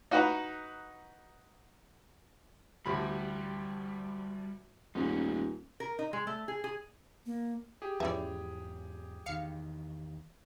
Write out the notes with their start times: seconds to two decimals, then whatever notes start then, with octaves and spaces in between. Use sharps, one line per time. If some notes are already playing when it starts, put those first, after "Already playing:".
0.11 D#4 F#4 B4 F#5 A#5
2.86 A1 D2 G3 B5
4.95 D#1 G#2 A3 C#4 D#4
5.80 A#4
5.99 D#4
6.13 G#3
6.27 A3
6.48 G#4
6.64 G#4
7.26 A#3
7.82 G4 G#4
8.00 E2 G#2 E3 F3 C#4 D5 E5
9.26 E2 D#3 F5 C#7